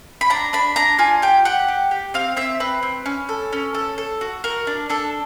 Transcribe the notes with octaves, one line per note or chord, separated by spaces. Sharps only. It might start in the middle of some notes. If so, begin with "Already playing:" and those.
B5
D4 A#5
D4 B5
D4 A#5
F4 G#5
G4 G5
G4 F#5
G4
G4
C4 F5
C4 E5
C4 B4
C4
C#4
A4
C#4
A4
A4
F#4
F#4 A#4
D4
D4 A4